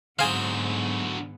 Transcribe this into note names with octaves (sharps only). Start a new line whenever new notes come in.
G#2 D3 F#3 B3 C4 G#4 F5 G#5